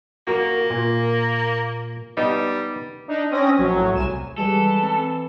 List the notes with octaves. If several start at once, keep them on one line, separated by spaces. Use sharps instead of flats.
A#3 F#4 A#4
A#2
G3 B3 D#4 D#5
D4 D#4
C4 C#4 D#6 A#6
A#1 F#3
A2
C2 G#5 E7
E3 G3 G#3 A4
C4